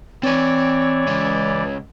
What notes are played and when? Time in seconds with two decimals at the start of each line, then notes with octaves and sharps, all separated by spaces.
0.23 E3 C4 C#5 D5 G#5
1.07 C#3 G#3